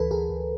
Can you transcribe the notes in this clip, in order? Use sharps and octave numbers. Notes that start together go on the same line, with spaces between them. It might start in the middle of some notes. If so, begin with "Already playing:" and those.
Already playing: D2 E3 A4 B4
D2 G#4 A#4
D2